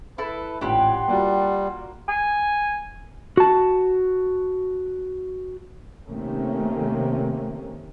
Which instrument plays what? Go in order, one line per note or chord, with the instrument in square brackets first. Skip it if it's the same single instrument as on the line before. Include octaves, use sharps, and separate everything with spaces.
[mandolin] E4 A4 [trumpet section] B4
[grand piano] A1 A#2 [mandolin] D4 G4 B4 [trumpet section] F#5 C6
[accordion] G3 [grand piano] A#3 F4 F#4
[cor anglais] G#5
[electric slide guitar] F#4 A5
[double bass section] C3 D#3 A3 A#3 C#4